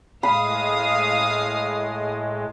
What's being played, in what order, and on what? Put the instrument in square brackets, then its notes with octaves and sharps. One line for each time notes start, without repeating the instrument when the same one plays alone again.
[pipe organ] A2 G#3 [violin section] F5 D#6 [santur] B5